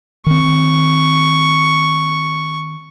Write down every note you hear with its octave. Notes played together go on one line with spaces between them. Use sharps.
D#3 C4 C#6